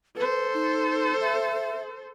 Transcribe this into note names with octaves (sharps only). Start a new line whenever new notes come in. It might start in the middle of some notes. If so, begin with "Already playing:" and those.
A4 B4 C5
D#4
E5